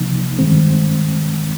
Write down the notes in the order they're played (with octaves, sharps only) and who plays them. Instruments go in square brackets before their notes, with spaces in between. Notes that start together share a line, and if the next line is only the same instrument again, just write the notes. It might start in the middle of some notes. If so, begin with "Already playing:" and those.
Already playing: [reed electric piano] C2 C3 F3 A#3 D#4
G2 D#3 G#3 C4